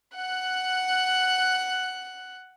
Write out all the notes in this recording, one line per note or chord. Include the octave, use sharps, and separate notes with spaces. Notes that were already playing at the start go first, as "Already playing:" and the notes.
F#5 F#6